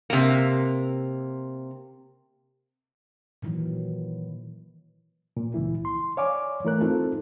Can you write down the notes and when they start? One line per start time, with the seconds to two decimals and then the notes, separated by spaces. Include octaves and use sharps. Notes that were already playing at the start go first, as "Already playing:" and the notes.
0.10 C3 A#3
3.42 A#2 D#3 E3 F#3
5.37 A#2
5.54 C#2 E3 E4
5.85 C6
6.17 C#5 D5 F5 G#5 D6
6.64 E3 A3 A#4 F#6
6.81 C4 D#4 F4 A4